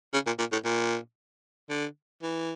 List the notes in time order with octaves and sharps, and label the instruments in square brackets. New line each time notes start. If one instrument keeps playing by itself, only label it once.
[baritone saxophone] C#3
A#2
A#2
A2
A#2
D3
E3